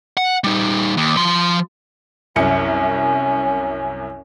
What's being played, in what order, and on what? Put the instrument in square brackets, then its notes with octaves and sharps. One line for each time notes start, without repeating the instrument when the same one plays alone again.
[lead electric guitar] F#5
G3 D#4
D#2
F3 C6
[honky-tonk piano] C2 F#2 C#7 [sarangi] C#4